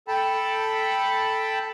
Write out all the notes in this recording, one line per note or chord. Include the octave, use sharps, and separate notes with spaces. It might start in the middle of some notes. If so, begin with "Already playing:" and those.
A4 G5 A5 B5